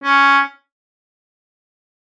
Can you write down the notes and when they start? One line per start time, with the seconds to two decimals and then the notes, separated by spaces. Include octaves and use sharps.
0.04 C#4